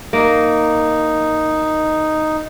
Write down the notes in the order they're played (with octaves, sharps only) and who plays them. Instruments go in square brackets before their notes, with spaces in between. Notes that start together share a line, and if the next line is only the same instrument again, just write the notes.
[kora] A#3 [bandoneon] D#4